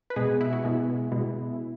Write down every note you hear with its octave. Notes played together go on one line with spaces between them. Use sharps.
B4
B2 G#3 B3 G#4
E4
F#4
B2 G#3 B3 E4
B2 G#3 B3